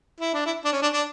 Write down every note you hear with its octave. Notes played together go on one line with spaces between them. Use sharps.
E4
D4
E4
D4
C#4
D4
D4